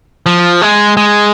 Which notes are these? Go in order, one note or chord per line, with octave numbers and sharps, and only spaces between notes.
F3
G#3
G#3